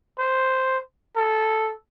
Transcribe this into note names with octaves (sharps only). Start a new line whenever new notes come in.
C5
A4